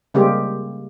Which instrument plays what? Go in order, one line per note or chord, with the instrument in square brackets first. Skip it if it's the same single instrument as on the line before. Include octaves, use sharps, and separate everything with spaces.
[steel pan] C#3 G3 G#3 A#3 C4 G4